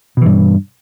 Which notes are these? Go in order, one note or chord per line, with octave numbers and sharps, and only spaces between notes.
G2 B2 E3